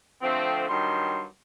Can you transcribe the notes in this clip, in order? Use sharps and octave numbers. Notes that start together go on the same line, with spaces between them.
D3 F3 A3 C4
G2 D#3 F#3 C6